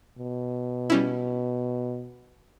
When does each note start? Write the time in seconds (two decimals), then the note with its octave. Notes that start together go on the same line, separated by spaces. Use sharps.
0.18 B2
0.90 G3 C#4 E4